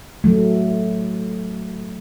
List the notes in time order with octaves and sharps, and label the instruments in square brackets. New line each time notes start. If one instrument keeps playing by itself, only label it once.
[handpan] F#3 A3